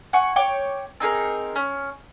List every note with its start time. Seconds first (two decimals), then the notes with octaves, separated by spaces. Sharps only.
0.13 F#5 G#5 C#6
0.36 C#5 G5 D6
1.00 C4 D#4 G#4 A#4
1.56 C#4